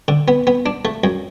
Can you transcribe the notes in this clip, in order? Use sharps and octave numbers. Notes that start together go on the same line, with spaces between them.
D3
B3
B3
D4
A3
F#2